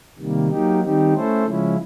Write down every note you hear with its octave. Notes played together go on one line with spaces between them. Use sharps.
C3 D#3 G3 A#3
F#3 A#3 D#4 G4
D#3 G3 C4 D#4 G4
A3 C#4 E4 A4 C5
C#3 F3 G#3 C#4 E4